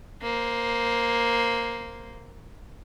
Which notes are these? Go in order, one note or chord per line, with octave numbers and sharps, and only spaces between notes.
A#3 C5